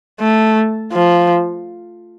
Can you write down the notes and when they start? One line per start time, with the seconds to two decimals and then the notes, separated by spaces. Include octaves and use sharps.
0.20 A3
0.92 F3